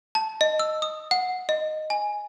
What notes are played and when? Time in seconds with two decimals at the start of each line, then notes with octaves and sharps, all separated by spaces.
0.15 A5
0.41 D#5
0.60 E6
0.82 D#6
1.11 F#5
1.49 D#5
1.90 G#5